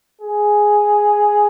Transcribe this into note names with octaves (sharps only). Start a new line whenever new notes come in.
G#4